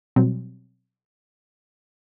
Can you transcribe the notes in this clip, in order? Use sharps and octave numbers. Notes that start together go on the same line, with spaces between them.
B2 F#3 G3 C4